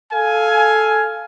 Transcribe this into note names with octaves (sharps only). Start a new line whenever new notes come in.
A4 F5 G#5